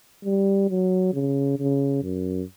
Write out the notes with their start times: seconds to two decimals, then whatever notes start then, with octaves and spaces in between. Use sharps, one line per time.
0.25 G3
0.69 F#3
1.13 C#3
1.58 C#3
2.03 F#2